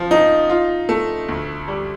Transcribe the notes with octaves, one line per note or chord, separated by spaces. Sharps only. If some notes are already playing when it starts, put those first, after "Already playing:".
Already playing: F3
D#4
F4
A3
D2
G3